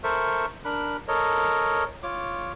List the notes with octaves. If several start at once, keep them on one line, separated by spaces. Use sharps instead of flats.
A4 A#4 C5 E5 C#6
D4 A#4 B5 F#6
A4 A#4 C#5 D#5
F4 C#5 D6